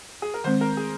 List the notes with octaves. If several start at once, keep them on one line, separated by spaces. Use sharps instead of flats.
G#4
A#4
D#3 G#3 C4 C5
A#4
G#4